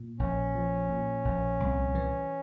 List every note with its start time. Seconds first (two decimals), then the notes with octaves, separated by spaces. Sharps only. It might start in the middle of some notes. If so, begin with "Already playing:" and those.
Already playing: A#2
0.19 A#1 C#4
0.55 F3
0.89 A#2
1.25 A#1
1.60 C2
1.95 E3